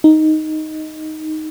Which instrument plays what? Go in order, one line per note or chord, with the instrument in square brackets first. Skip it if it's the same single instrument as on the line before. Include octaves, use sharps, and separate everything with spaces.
[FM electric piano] D#4